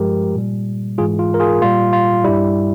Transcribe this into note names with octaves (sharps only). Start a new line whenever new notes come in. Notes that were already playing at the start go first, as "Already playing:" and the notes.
Already playing: G2 F3 G#3 G4 A#4
A#2 G3
G#2 E3 G#3 F4 G#4
F4
A#4
F4 G#4
A#2 G3 F4
F4
G2 G3 E4